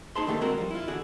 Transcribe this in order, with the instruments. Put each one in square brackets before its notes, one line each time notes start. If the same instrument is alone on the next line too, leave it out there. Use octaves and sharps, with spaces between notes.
[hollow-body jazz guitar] D#4 G#4 C5 A5 B5 C6
D3 D#3 A3 A#3 G4 A4
G#3 C4 F#4 A#4 C5
F3 G3
E4 F4
E2 D3 F#4 G#4